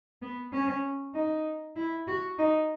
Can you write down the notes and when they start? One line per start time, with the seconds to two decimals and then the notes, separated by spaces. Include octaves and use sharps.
0.22 B3
0.53 C#4
1.14 D#4
1.76 E4
2.07 F#4
2.39 D#4